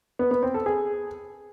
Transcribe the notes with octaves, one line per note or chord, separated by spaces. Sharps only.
B3
B3
C4
A4
G#4